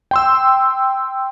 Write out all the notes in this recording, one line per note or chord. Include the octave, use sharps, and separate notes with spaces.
G5 C6 E6